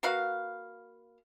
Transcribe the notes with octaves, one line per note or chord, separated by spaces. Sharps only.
A#3 F#4 B4 F5